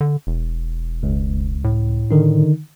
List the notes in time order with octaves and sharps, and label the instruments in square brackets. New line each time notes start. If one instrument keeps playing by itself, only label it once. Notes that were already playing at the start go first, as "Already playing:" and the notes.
[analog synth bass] D3
E1
[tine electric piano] C#2
[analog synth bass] A2
[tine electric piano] D3 D#3 D#4